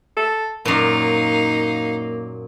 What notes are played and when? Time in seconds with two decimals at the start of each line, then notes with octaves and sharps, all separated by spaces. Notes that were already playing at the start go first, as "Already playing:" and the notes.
0.17 A4
0.65 F#2 A#2 A#3 D#4 F5